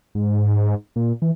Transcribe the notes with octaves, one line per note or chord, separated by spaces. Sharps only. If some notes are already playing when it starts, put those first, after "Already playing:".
G#2
A#2
E3